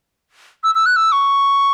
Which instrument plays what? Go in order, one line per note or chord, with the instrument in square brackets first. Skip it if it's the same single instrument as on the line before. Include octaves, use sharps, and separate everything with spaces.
[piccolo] E6
E6
F#6
E6
C#6